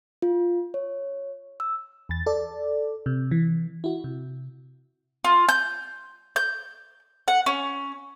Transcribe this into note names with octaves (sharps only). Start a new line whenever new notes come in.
F4
C#5
E6
E2 A6
A4 D5
C3
E3
E4 F#4
C3
F4
G6
G6
F#5
C#4